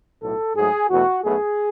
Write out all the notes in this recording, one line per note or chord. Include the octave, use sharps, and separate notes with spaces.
B1 A2 F#3 A4
G#2 F#3 A3 G#4
E2 B2 A3 F#4
B1 B2 A3 G#4